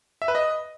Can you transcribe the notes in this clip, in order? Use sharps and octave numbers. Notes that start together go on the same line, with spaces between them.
E5
B4
D#5